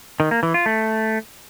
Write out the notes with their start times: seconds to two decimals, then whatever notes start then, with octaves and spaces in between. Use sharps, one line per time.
0.20 D#3
0.31 A#3
0.43 E3
0.54 F4
0.66 A3